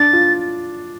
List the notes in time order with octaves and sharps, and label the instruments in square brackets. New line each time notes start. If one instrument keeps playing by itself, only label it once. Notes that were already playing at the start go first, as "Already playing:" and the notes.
Already playing: [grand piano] D4 [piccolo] A6
[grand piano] F4